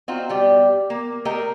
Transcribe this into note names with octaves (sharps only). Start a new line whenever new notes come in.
C4 D#4 F4 F#4
B2 G3 G4
A#3
A3 A#3 G4 A#4 D#5 G5